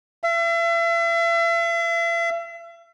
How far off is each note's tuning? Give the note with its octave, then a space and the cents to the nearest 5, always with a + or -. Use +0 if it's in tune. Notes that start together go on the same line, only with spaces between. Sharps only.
E5 +40